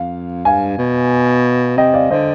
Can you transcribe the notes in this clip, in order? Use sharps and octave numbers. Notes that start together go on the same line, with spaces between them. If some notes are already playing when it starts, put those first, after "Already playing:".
Already playing: F2 F5
G2 F5 G#5
B2
C3 D#5 G5
D5 F5
D3 C5 D#5